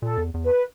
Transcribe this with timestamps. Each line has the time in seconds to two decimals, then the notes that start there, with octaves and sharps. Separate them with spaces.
0.02 A#2 A4
0.17 E2
0.34 E2
0.44 B4